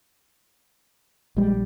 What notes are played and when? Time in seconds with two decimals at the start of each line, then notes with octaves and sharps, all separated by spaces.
1.37 A#1 G3 G#3